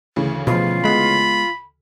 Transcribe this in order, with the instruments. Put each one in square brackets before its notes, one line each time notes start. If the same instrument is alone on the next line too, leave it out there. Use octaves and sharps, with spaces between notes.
[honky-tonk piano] D2 C#3 E3
[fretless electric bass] B2 F3 [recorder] F4
[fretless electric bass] G#3 B3 [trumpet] B5